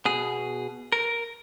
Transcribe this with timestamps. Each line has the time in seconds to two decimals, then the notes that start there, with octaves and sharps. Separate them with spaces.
0.05 B2 G#4
0.92 A#4